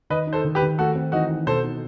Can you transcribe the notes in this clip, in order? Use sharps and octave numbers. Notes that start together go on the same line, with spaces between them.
D#3 B4 D#5
D#4
A4 C5
D#3
G4 B4
D#3
A3 F#4 A4
C4
E3 D#4 F#4
D#4
B2 A4 C5
D#4